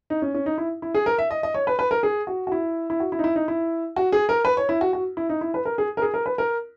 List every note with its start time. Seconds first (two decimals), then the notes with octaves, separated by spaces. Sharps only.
0.10 D#4
0.22 C#4
0.34 C#4
0.46 D#4
0.58 E4
0.82 E4
0.95 G#4
1.06 A#4
1.18 E5
1.31 D#5
1.43 D#5
1.54 C#5
1.67 B4
1.79 B4
1.91 A#4
2.03 G#4
2.27 F#4
2.47 F#4
2.52 E4
2.90 E4
3.00 F#4
3.12 E4
3.19 D#4
3.24 E4
3.36 D#4
3.48 E4
3.96 F#4
4.12 G#4
4.29 A#4
4.45 B4
4.57 C#5
4.69 E4
4.81 F#4
4.93 F#4
5.17 E4
5.29 D#4
5.41 E4
5.54 B4
5.65 A#4
5.78 G#4
5.97 A#4
6.02 G#4
6.14 A#4
6.26 B4
6.38 A#4